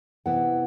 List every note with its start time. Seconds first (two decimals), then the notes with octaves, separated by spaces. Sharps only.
0.26 C3 E3 B3 E4 F#5